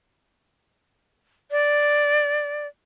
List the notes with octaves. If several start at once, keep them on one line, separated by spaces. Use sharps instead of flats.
D5